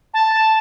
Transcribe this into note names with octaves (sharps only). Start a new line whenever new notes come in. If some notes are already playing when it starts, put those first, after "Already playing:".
A5